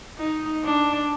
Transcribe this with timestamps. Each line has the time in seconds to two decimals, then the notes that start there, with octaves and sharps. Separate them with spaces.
0.18 D#4
0.64 D4